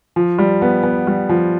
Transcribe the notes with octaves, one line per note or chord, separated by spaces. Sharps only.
F3
G3
B3
B3
G3
F3